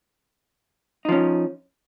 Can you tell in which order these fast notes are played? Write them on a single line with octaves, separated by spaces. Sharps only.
D#4 F3 C#4